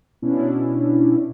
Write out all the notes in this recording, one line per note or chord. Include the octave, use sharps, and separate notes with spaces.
B2 C#4 D4 E4